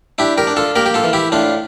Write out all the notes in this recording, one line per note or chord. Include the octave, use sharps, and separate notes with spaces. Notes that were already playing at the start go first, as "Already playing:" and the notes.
D4 E4 G4
G4 A#4
D4
F4 A4
A#3 G4 A#4
G4
F4 A4
E3
E4 G4
A2 D4 F4